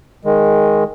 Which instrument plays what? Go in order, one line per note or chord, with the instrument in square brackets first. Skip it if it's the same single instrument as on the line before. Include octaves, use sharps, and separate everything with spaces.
[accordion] D#3 G#3